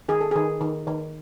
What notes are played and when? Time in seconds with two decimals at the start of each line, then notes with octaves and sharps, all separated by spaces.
0.09 D#3 G#4
0.21 A4
0.31 D#3 G#4
0.61 D#3
0.87 D#3